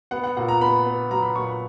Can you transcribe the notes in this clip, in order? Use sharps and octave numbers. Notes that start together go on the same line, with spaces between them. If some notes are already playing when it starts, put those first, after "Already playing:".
B3 F#5
F#5
A#2 F#5
A#5
B3 B5
B3
F#3 A#5
B5
A#2 C#6
B5